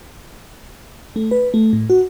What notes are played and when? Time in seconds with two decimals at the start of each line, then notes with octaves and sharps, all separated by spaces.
1.16 A3
1.31 B4
1.54 A3
1.73 A2
1.90 F#4